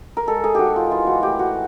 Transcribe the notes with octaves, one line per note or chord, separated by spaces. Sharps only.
A#4
G#3 A4
G#4
D#3 F#4 G4
F4
E3 F4
F#4
A2 G4
F#4